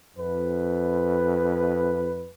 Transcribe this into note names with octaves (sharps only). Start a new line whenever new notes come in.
F2 B4